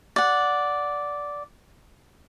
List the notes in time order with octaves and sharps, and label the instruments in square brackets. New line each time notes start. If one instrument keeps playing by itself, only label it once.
[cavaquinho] D5 F#5